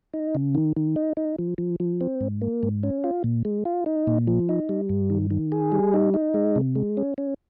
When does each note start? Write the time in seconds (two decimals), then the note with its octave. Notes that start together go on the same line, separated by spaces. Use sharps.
0.14 D#4
0.35 C#3
0.55 D#3
0.77 D#3
0.96 D#4
1.17 D#4
1.39 F3
1.58 F3
1.80 F3
2.01 C4
2.21 G#2
2.41 A#3
2.63 G#2
2.83 C#4
3.04 F4
3.24 A#2
3.45 G#3
3.65 F4
3.86 D#4
4.07 A#2
4.27 F3
4.49 D#4
4.69 G3
4.89 G2
5.10 D#3
5.31 D#3
5.52 G#4
5.72 G3
5.94 D#4
6.14 D#4
6.34 G#3
6.56 C3
6.75 G#3
6.97 C#4
7.18 C#4